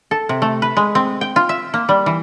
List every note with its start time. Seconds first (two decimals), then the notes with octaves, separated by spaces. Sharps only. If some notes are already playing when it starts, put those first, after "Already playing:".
0.11 A4
0.29 C3
0.42 A3
0.62 B4
0.77 G#3
0.95 C4
1.21 G5
1.36 F4
1.49 E5
1.74 A#3
1.89 G3
2.06 E3